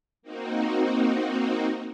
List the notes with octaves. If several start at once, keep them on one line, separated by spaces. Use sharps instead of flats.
A#3 C4 D#4 F#4